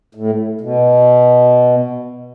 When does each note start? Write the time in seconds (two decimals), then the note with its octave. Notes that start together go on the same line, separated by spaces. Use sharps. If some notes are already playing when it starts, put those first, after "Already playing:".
0.15 A2
0.61 B2